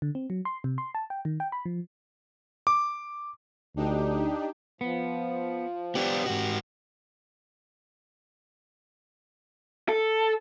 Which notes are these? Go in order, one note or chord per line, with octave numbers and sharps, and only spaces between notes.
D3
C4
F#3
C6
C3
C6
A5
G5
D#3
G5
B5
F3
D6
D2 D4 D#4 G4
F3 B3
B3 D4 G4
G#2 F#4
A4